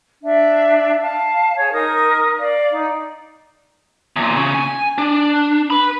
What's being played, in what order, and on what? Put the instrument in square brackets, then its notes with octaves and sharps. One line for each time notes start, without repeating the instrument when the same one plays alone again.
[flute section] D4 E5
F5 A5
G#4 C#5
D#4 A#4 D#6
D5 F5
D#4
[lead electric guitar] E2 A#2
C#3
G#5
D4
B4 B5